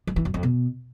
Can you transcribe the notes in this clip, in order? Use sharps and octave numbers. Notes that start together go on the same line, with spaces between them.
F3
E3
F#2
F2
B2